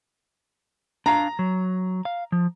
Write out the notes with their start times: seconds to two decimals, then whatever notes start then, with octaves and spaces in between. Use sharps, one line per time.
1.06 D4 F5 A#5
1.39 F#3
2.05 F5
2.32 F3